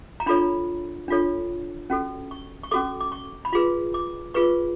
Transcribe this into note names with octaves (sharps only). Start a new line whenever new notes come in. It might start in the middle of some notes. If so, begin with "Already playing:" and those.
A#5
D4 F4 A4 C#5 B5
D4 F4 A4 C#5
C#4 F#4 A4
C#6
C#6
C#4 F#4 A4 D6
D6
C#6
B5
F4 G#4 B4 C6
D6
F4 G#4 B4 C#6